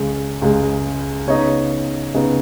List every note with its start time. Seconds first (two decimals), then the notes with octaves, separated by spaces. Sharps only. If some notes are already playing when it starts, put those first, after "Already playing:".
Already playing: C#2 C#3 G#3
0.42 C#2 C#3 G#3
1.27 C#3 B3 D#4 C#5
2.14 C#3 B3 D#4